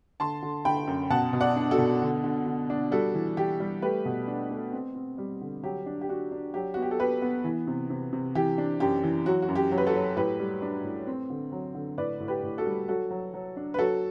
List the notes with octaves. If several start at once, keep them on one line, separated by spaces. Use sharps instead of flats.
D3 A5 C6
D3
D3 G5 B5
F#2
B2 F#5 A5
B2
D5 F#5
D4
F#4 A4
B2
D3
D3
D3
D4
G3 F#4 A4
E3
E3 G4
G3
A3 G4 B4
B2
D4
A3
C4
C4
G3
D3
F#3 G4
D4
G4
D4 F#4
D4
F#3 G4
B3 F#4
G4
A4
B3 G4 B4
B3
E3
C3
C3
C3
E3 G4
D4
F#2 G4
E3
F#3 F#4
F#4
F#2
G4
F#3
B4
F#4 A4
F#3
A2 G4 B4
G3
D4
A2
C4
D3
F#3
D3
A2 B4 D5
A2
G4 B4
A2
F#4 A4
G3
F#3 F#4 A4
F#3
F#3
D4
B4
F#3 F#4 A4